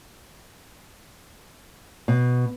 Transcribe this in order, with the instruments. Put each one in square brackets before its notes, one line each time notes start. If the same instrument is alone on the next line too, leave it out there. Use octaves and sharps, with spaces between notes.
[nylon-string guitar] B2